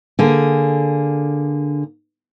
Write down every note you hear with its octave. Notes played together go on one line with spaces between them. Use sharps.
D3 A#3 G#4